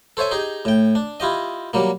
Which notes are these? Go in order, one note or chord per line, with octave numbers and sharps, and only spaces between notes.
A4 C5 C#5 E5 G#5
D#4 G4 G#4
A2 G5
D4
E4 F4 G4 D#5
F#3 G3 A#3